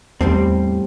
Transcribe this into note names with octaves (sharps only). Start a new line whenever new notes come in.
E2 A2 G3 C4